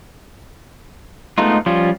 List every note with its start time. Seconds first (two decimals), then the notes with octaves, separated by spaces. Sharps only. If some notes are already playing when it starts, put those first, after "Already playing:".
1.38 G#3 A3 B3 D#4 F4
1.66 F3 G3 C#4 F4